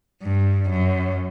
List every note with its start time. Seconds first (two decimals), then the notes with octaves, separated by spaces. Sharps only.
0.23 G2
0.69 F#2